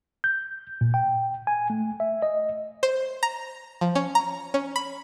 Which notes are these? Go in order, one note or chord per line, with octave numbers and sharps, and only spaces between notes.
G6
A#2
G5
G#5
A3
E5
D#5
C5
A#5
F3
C#4
A#5
C#4
B5